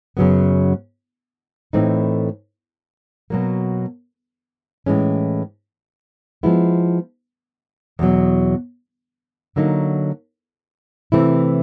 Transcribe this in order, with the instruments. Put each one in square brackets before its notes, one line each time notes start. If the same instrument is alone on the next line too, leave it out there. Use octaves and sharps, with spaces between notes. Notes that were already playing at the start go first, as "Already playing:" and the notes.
[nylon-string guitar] F#2 C#3 F#3 B3
A2 E3 A3 C4 D#4
B2 F#3 A#3
A2 E3 G#3 C#4
F3 G#3 B3 E4
E2 B2 F#3
D3 F#3 A#3 D#4
C3 E3 A3 C4 E4